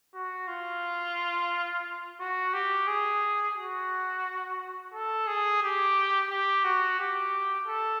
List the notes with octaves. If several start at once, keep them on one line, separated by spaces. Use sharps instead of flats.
F#4
F4
F#4
G4
G#4
F#4
A4
G#4
G4
G4
F#4
G4
A4